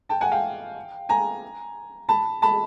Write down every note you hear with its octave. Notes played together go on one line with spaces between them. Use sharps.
G5 A5
F#5 G#5
F5 G5
G#5 A#5
A5 B5
A5 B5